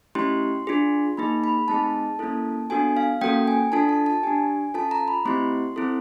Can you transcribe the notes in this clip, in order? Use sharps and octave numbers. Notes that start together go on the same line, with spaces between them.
A3 C#4 E4 G4 C6
D4 F4 G#4
A#3 D#4 G#4 B5
B5
A3 C4 D#4 G#4 A5
A#3 C#4 E4 A4
B3 D4 F#4 A4 G#5
F5
A#3 C#4 F#4 A4 G5
G#5
D4 F4 A4 A5
A5
A5
D4 G4 G#5
C#4 F4 A4 A5
A#5
B5
A3 C4 E4 G4 C6
C4 E4 A4